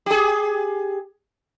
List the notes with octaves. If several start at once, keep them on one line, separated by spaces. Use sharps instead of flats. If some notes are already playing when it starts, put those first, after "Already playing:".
G4 G#4